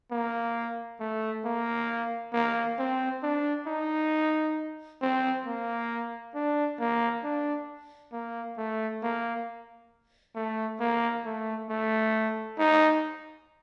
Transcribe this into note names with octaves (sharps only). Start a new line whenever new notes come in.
A#3
A3
A#3
A#3
C4
D4
D#4
C4
A#3
D4
A#3
D4
A#3
A3
A#3
A3
A#3
A3
A3
D#4